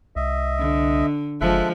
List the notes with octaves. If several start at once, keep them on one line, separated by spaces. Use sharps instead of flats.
C2 D#5 E5
D3
F#1 F3 G#3 A4 E5 F#6